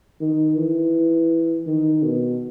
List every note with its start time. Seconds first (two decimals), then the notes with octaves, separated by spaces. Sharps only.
0.21 D#3
0.57 E3
1.67 D#3
2.03 B2